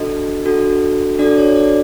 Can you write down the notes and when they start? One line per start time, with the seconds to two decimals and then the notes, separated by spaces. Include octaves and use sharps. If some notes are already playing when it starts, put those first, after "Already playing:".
Already playing: D4 F#4 A4 D#5
0.45 D4 F#4 A4
1.19 D4 F#4 A4 D5
1.38 C#5
1.56 D5